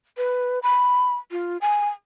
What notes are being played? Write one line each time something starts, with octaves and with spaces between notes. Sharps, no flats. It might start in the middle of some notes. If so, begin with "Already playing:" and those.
B4
B5
F4
G#5